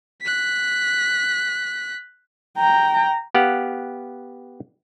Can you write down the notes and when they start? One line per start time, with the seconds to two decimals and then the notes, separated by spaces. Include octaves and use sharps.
0.21 F#6 B6
2.57 G5 A#5
3.34 B3 G4 F5 F#5